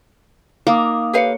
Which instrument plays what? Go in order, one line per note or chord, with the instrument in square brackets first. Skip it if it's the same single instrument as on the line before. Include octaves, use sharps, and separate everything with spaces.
[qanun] A#3 [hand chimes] D#4 D6 D#6
[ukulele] G4 B4 F5 [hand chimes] A4 C#5 C#7